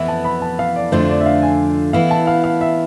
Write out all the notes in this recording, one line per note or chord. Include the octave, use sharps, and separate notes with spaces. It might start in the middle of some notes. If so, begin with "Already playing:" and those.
Already playing: F2 E3 B3 E4 E5
A5
B5
A5
F5
D5
F2 D3 A3 D4 F4 C5
D5
E5
F5
G#5
E3 B3 E4 F5
A5
F5
F5
E5